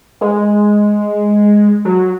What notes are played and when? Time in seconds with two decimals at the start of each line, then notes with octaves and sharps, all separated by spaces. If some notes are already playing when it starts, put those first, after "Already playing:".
0.21 G#3
1.85 F#3